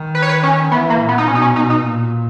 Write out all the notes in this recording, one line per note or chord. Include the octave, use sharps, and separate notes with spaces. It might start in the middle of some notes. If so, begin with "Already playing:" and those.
Already playing: D#3
B4
C#5
B4
C#4
E3 B3
A#3
A#2
B3
D#4
B2 C#4
D#4
C#4
B2 D#4
D#4
A#2